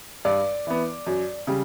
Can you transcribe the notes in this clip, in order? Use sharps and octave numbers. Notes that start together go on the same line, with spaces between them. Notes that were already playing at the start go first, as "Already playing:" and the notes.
G2 D5
E3 B3
F#2
C#3 G3